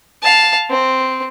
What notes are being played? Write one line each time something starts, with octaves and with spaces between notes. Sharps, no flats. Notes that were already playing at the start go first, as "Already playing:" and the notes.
F5 A5
C4